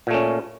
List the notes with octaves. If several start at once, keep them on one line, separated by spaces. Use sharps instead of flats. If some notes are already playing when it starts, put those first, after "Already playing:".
A#2 A3 C#4